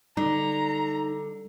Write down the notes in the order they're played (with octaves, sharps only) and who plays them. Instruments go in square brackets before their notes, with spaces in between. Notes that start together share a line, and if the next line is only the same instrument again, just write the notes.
[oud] D3 [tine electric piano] G3 [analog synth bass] D#4 [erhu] A#5